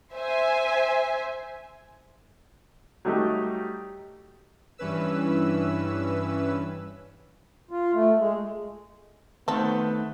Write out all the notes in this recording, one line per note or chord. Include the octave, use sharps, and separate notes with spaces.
C5 E5 G#5
F#3 G3 A3 D#4 G4
G2 E3 C#4 B4 E6
F4
A3
G#3
D#3 A3 B3 C4 A4 C5